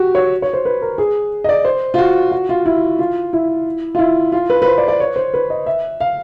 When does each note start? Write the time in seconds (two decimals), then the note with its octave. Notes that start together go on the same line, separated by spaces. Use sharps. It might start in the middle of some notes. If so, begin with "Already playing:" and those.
Already playing: F#4 G4
0.15 C#5
0.42 C#5
0.53 C5
0.65 B4
0.82 A#4
0.98 G#4
1.44 D#5
1.49 D5
1.65 C5
1.94 F4
1.98 F#4
2.32 F#4
2.49 F4
2.66 E4
2.99 F4
3.33 E4
3.95 F4
3.99 E4
4.32 F4
4.50 B4
4.62 B4
4.66 C5
4.78 D5
4.88 D5
5.00 C#5
5.16 C5
5.34 B4
5.50 D#5
5.66 E5
6.01 F5